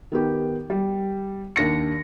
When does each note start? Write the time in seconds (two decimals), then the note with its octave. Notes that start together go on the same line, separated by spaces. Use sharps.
0.12 D#3 B3 G4
0.70 G3
1.56 D#2 D4 A#6 C#7